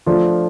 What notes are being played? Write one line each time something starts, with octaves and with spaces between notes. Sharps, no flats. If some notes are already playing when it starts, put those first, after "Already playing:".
F3 A3 D4 F4